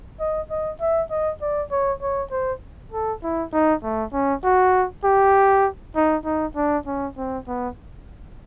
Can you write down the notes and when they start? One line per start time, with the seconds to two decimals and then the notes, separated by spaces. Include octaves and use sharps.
0.20 D#5
0.51 D#5
0.81 E5
1.11 D#5
1.42 D5
1.72 C#5
2.02 C#5
2.32 C5
2.92 A4
3.24 E4
3.53 D#4
3.83 A3
4.13 C#4
4.44 F#4
5.04 G4
5.96 D#4
6.25 D#4
6.56 D4
6.86 C#4
7.17 C4
7.48 B3